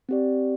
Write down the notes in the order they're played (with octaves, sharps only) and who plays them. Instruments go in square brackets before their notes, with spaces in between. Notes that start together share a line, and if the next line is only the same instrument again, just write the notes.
[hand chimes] C4 G4 D5